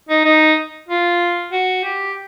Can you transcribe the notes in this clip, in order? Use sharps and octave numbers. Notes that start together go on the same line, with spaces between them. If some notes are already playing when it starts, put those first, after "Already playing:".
D#4
D#4
F4
F#4
G4